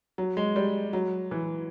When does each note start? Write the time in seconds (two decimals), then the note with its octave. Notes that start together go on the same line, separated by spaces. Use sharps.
0.18 F#3
0.37 G#3
0.56 G3
0.93 F#3
1.31 E3